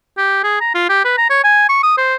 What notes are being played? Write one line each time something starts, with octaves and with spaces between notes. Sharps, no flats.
G4
G#4
A#5
F4
G4
B4
A#5
C#5
G#5
C#6
D#6
C5